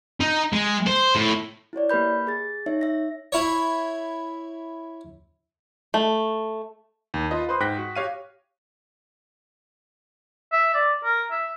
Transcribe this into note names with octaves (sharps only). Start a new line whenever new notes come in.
D#4
G#3
C5
A2
E4 F#4 C#5 D5
A#3 G4 B4 B5 G6
G#4 A6
D#4 C#5 E5
E5 A#6
E4 C#5
A3
D#2
F4 B4 D#5
B4 C5 C6 D#6
G#2 G5 F#6 A#6 B6
F#4
G4 C#5 F5 D#7
E5
D5
A#4
E5